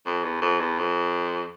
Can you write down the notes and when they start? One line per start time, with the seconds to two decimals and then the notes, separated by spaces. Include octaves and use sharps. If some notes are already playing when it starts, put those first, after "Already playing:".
0.06 F2
0.23 E2
0.41 F2
0.59 E2
0.78 F2